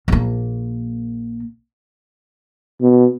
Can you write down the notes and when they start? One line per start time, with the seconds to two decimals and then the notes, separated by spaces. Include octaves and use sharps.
0.08 A#1 A#3
2.81 B2